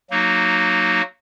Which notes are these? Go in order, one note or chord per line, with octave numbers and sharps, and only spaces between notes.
F#3 A#3 D#4 F#4